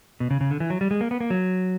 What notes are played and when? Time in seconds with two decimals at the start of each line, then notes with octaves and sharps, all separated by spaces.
0.20 B2
0.31 C#3
0.41 C#3
0.51 D3
0.60 E3
0.70 F#3
0.81 G3
0.91 G#3
1.01 A#3
1.11 B3
1.21 A#3
1.30 F#3